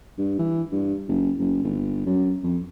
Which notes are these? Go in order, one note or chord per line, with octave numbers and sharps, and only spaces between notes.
G2
E3
G2
F#1
F#1
G1
F#2
F2